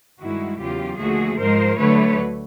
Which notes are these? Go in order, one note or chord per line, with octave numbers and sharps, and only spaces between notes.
G2 D#3 G#3 E4 F#4
E2 C#3 F#3 F4 G4
D#2 D3 F3 A3 F#4 G#4
G#2 F3 G#3 A#4 C5
D2 D3 F#3 A3 B4 C#5